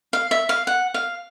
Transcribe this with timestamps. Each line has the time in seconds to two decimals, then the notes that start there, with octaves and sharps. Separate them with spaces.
0.13 F5
0.31 E5
0.49 F5
0.67 F#5
0.94 F5